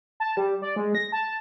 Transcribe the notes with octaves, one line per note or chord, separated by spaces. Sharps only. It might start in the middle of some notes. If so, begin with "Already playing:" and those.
A5
G3
D5
G#3
A#6
A5